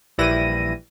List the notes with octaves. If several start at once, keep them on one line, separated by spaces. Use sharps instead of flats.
A#1 E3 G3 E4 A#6 D#7